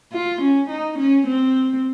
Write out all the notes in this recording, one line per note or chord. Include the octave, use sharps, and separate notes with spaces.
F4
C#4
D#4
C#4
C4